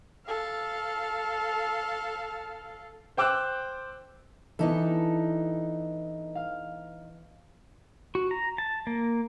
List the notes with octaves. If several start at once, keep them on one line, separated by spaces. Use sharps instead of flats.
A4 F5
C5 G5 D6 E6 F#6
E3 B3 D4 D#4 A4
F5
F#4
A#5
A5
A#3